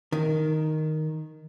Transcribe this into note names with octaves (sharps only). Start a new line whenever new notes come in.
D#3